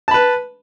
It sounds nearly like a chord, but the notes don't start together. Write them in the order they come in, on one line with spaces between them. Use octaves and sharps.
A5 B5 B4